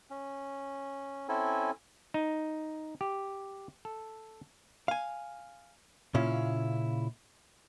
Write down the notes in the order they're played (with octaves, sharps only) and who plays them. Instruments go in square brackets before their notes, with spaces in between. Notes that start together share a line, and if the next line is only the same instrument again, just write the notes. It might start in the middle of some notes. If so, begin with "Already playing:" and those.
[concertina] C#4
C4 C#4 E4 A4 G#5
[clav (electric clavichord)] D#4
G4
A4
[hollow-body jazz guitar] F5 G#5
A#2 C#3 C#4 E4 F4